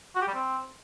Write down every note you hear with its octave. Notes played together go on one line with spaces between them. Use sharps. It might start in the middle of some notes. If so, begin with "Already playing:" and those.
F#4
G4
G3
C4